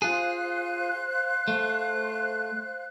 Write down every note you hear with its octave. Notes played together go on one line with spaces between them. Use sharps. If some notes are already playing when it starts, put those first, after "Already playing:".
F4 G#4 C5 F5 F#6
A3